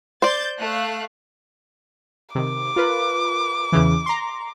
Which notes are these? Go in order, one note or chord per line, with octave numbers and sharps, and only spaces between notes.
C5 D5 G6 A6
A3 F5 F#6
C3 D#3 D6
F4 A#4 B4
E2 C#3 E3
A#5 C6